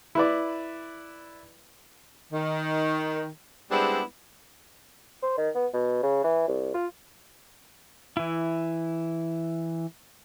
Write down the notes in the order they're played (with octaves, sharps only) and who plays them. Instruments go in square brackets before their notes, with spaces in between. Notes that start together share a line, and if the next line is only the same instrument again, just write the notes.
[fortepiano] E4 B4 D5
[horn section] D#3
G3 G#3 B3 C4 D4 E4
[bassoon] C5
D#3
B3
B2
C#3
E3
C2
F4
[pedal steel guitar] E3 E4